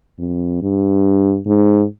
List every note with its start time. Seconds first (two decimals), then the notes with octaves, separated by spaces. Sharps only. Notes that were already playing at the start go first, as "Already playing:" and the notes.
0.19 F2
0.62 G2
1.46 G#2